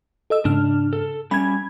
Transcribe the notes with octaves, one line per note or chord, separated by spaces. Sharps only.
A4 D#5 E6
G#2 C#3 D4 F6
A4
G3 C#4 B5 G#6